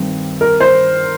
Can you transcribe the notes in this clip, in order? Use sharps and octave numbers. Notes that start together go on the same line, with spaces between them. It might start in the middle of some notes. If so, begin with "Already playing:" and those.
Already playing: G2 D#3 G3 C4
A#4
C5